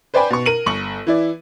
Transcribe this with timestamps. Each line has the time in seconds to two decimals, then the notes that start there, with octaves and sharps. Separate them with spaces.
0.14 B4 C5 D5 G5 G#5 B5
0.30 B2 C#6
0.46 A#4 D#7 F#7
0.66 G1 C#6 F#7
1.07 E3 E4 D5